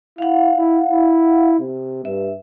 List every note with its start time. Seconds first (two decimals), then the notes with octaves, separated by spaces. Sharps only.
0.18 E4 F5 F#5
0.57 E4
0.89 E4
1.60 C3
2.05 G2 E5